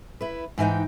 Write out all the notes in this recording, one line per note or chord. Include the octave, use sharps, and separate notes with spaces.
E4 B4
G#2 E3 F#3 D#4 G5